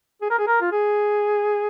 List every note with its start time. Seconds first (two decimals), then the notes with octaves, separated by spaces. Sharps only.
0.22 G#4
0.30 A#4
0.39 G#4
0.47 A#4
0.61 F4
0.72 G#4